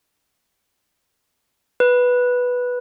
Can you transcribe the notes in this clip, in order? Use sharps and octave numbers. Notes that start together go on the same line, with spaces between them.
B4